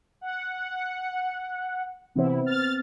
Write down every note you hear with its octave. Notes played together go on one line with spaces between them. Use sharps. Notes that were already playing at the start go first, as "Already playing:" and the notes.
F#5
C3 E3 B3 C4 E4
F6 A6